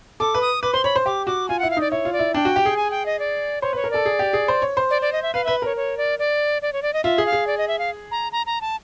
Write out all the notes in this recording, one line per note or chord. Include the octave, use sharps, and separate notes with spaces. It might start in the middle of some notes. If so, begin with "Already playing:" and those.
A4 D6
B4
D#6
B4 D6
C5 C6
C#5 B5
C5
G4 D6
F#4 D6
F4 G#5
E4 F#5
F5
D#4 D5
E4 C#5
F4
D5
E4
D4 G5
F#4
G4
G#4
G#5
G5
D#5
D5
C5 C#5
B4 C#5
A#4
A4 D5
G#4
G4
G#4
C5
C#5
C5
D5
D5
D#5
E5
B4 F5
B4 E5
A#4 C#5
C#5
D5
D5
D5
C#5
D5
D#5
F4 E5
G#4
F5
G#4
D5
D#5
E5
F5
A#5
A#5
A#5
A5